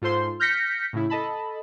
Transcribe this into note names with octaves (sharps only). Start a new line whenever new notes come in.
G#2 F4 A4 C5 C6
F6 G6 A#6 B6 C#7
A2 C#3 E4
A4 D#5 A5 B5